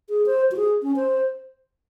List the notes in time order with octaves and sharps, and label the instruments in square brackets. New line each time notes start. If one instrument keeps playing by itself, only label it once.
[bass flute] G#4
C5
F#4
G#4
C#4
C5